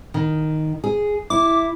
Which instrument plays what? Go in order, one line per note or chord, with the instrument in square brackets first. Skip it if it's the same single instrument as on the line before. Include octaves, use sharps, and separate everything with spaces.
[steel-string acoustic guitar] D#3
G#4
[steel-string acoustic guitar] E4 [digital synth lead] D6